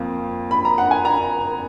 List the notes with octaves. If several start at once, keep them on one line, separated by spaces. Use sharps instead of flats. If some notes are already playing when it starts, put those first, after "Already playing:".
Already playing: F2 F3 A#3
B5
A#5
F#5
G#5
A#5